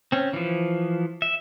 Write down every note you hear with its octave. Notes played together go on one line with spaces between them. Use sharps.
C4 C#4
E3 F3
E5